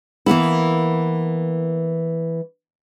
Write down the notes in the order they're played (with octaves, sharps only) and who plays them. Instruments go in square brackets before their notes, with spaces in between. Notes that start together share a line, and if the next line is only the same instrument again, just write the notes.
[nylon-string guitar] E3 A#3 B3 E4